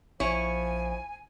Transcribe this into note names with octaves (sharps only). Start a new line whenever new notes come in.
A#1 F3 E4 C#5 G#5